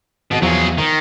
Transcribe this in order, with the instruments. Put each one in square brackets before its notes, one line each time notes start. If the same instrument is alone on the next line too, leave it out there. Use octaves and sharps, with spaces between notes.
[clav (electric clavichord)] G#1 F#4 D#5 [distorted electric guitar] B2
[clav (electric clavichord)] E2 F3 F5 [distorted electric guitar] F#3 G#4
[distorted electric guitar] D#3